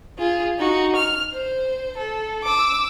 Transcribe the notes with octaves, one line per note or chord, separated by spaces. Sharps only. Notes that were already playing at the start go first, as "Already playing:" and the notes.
F4 G#4
D#4 F#4
F6
C5
A4
D6 E6